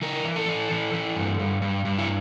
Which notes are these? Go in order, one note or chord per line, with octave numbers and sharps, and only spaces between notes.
E3 A#4
E3
A4
E3
E3
E3
G2
G2
G2
G2
E4